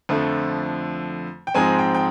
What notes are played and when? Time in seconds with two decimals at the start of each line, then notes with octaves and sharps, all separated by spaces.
0.09 F2 D3 F3 A3
1.47 G5
1.54 G#2 F3 G#3 C4 G#5
1.79 G5
1.94 G5